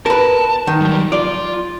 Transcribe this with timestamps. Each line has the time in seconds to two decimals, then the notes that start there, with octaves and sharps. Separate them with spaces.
0.06 A#4 B4 A5
0.67 D#3
0.81 F#3 G3
1.12 F4 D5